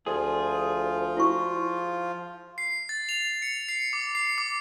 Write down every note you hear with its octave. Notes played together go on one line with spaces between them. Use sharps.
D2 F3 F4 G#4
E4 F#4 C#6
C7
A6
F7
C#7
C7
D6
C7
D6